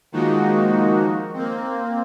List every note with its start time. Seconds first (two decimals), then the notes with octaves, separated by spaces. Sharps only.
0.12 D#3 F3 G#3 A#3 D#4 F#4
1.34 A#3 C4